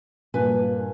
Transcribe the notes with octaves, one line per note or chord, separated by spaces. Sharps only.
G2 A#2 B4 G#5